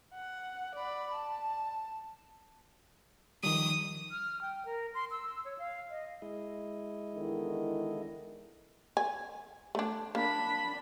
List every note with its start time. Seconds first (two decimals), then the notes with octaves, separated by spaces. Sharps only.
0.14 F#5
0.75 D5 B5
1.15 A5
3.43 D#3 F3 G3 D#6
4.11 F6
4.42 G5
4.65 A#4
4.94 C6
5.11 E6
5.45 C#5
5.58 F5
5.90 D#5
6.22 G#3 E4 D#5
7.15 E2 D3 D#3
8.97 G#5
9.75 A3 D4
10.15 A#3 D4 B5